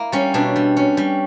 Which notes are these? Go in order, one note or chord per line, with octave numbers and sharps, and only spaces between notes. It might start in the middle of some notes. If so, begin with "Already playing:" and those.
Already playing: A#3 E4
G3 C#4
B2 D4
G3
C#4
G3